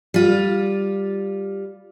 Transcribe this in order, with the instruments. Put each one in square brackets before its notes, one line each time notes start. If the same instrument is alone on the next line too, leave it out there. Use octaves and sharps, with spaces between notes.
[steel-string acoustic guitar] G3 F4